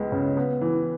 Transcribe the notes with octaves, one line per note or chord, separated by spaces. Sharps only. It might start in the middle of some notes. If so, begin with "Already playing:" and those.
Already playing: C#2 G#3 B3
C#3
B3
E3